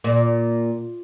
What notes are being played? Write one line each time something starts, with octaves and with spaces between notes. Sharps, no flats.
A#2